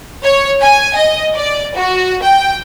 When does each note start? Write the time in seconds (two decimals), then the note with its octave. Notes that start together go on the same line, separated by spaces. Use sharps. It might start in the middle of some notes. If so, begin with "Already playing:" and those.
0.24 C#5
0.62 G#5
0.96 D#5
1.35 D5
1.76 F#4
2.23 G5